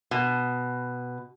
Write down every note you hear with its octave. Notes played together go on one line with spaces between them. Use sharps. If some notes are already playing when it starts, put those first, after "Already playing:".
B2